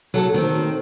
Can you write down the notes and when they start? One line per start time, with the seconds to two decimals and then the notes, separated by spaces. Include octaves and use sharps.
0.14 F#3 A4
0.34 D#3 C4